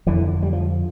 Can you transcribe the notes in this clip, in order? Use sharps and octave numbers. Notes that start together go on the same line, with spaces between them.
F2 D3 E3
G3
F3